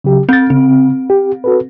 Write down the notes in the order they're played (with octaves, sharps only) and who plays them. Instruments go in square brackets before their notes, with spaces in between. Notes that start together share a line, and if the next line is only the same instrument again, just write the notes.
[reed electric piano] C#3 F#3 G4
[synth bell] C4 [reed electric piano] G6 A6
[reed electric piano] C#3 [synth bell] C4
[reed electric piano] G4
F#4 A4 B4